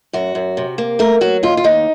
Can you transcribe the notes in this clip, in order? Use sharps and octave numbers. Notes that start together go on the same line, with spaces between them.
F#2 F#4
F#2
C3
A#3
A3 A#4
F#3 F#4
D#2 F4
F4
D#2 D#4